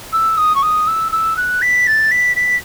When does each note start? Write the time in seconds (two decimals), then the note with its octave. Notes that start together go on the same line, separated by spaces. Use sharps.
0.13 E6
0.38 D#6
0.55 C#6
0.63 D#6
0.87 E6
1.12 E6
1.37 F#6
1.62 B6
1.87 A6
2.11 B6
2.36 B6